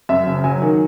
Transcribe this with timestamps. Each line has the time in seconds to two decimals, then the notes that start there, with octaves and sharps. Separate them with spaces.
0.09 F#2 E5
0.26 F#1
0.44 F#3 G#5
0.62 D#3